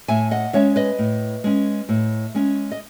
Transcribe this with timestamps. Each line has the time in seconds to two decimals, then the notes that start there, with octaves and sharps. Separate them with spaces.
0.08 A2 E5 G#5
0.31 D#5 F#5
0.53 G#3 C#4 C#5 E5
0.76 B4 D#5
0.99 A2
1.44 G#3 C#4
1.89 A2
2.34 G#3 C#4
2.72 D#5